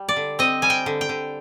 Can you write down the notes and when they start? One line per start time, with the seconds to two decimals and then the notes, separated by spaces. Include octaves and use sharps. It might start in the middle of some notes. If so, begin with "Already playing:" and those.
Already playing: G3
0.09 D5
0.16 D3
0.39 C4 D#5
0.62 G3 G#5
0.70 G5
0.86 D3
1.01 G5
1.09 D3